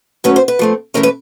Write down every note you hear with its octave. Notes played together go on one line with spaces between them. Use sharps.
F#3 A3 C#4 B4
C5
B4
F3 A3 C4
A2 E3 A3 C#4 A#4
B4